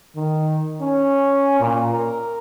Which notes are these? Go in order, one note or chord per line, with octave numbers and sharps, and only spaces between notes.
D#3
C#4
A#2
A#4